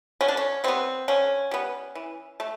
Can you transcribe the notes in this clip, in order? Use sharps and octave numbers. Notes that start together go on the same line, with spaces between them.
D3 C#4
D4
C#4
G3 B3 C4
D3 C#4
G3 B3
E3
A3